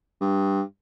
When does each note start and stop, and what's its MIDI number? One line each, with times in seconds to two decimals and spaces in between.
0.21 0.61 43